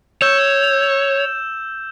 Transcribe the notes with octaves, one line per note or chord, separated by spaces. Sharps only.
C#5 E6 G6 E7